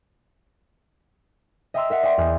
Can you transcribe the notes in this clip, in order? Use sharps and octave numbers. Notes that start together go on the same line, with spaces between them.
D#5 E5 G5 A#5 C6 E6
A#4 E5 F#5
D5 D#5 G5 C6
E2